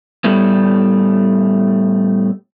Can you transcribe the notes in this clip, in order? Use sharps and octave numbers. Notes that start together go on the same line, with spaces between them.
A2 G3 A3 B3